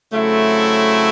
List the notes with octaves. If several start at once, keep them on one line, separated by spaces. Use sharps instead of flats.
C#3 F#3 A3 C4 E4